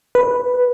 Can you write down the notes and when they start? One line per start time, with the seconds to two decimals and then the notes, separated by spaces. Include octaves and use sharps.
0.15 B4